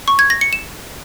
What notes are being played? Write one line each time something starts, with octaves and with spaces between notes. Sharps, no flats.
C#6
G#6
A#6
C#7
E7